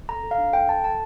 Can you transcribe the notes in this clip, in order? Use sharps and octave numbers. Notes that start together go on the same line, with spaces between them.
A4 A#5
A4
F5
D4
A4 G5
A4 A5
A4 A5